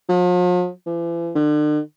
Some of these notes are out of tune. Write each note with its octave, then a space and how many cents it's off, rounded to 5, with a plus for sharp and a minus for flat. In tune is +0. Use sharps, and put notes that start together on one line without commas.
F3 +45
E3 +45
D3 +40